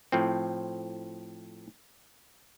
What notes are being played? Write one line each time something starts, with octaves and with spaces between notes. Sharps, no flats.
A2 F3 C4